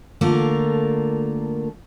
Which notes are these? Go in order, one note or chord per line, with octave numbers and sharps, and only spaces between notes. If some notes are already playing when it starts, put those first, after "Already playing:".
D3 A3 A#3 F4 A#4